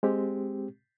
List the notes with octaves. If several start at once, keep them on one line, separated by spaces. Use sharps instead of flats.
G#3 C4 G4